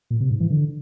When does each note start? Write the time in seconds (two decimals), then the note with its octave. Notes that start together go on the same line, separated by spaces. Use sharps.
0.11 A#2
0.20 C3
0.30 G#2
0.40 E3
0.50 D3